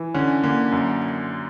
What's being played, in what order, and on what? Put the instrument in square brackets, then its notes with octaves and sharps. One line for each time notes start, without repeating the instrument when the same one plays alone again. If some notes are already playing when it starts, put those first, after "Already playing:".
Already playing: [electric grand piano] E3
[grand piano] D3 [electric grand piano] C#4
[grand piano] D3 [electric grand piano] A#3
[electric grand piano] F#2